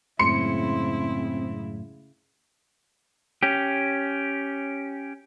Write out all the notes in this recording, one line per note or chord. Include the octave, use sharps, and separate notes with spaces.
F#2 A2 C#3 G#3 C4 E4 C6 C#7
C#4 G4